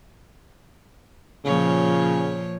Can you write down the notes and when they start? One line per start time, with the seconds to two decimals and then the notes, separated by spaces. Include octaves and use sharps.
1.45 A#2 C#3 F3 C#5